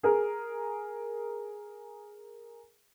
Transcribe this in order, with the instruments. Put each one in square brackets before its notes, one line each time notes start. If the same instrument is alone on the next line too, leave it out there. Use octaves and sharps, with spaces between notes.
[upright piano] G#4 A#4